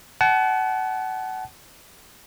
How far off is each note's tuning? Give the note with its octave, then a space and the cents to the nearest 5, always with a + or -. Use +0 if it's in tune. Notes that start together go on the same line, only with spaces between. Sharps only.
F#5 +25 A5 -35